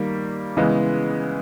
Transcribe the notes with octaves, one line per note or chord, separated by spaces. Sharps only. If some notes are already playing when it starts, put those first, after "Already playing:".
Already playing: D#3 G3 A#3
C#3 E3 G#3 B3